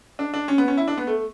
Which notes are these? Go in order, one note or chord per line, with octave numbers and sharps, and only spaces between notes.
D4
D4
C#4
B3
C#4
E4
D4
B3
A3